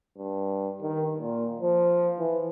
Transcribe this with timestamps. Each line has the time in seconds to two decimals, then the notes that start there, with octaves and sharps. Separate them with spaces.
0.18 G2
0.82 D#3
1.20 A#2
1.61 F3
2.19 E3